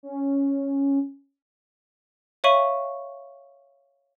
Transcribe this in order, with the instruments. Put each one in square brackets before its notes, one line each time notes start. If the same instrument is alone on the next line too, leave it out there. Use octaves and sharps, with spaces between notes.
[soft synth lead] C#4
[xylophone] C#5 E5 F5 C#6 D#7 F#7